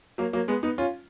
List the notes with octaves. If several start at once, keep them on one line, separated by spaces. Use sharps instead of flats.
F#3 A#3
F#3 A#3
G#3 B3
B3 D#4
C#4 F4